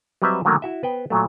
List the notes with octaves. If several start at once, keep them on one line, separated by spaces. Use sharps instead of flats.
F#3 G3 C4 B4 D#5 E5
D3 D#3 F#3 A3 A#3
E4 F#4 E5
B3 B4 C5 G5
A#2 F#3 A3